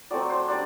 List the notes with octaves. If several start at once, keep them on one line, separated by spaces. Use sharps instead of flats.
F#3 A3 C4 D5
C5
G3 D4 D5